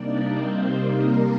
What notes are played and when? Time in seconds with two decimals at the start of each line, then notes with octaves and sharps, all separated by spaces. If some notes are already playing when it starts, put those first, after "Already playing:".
Already playing: C3 G3 A#3 D4 D#4 D5
0.33 C4 C5
0.81 A#3 A#4